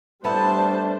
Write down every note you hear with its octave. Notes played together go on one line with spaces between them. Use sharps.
G3 A3 B3 D4 E4 C5 A5